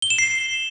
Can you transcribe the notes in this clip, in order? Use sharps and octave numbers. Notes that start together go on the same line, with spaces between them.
G7
E7
C7